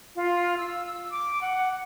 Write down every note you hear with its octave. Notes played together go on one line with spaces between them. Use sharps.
F4
E6
D6
F#5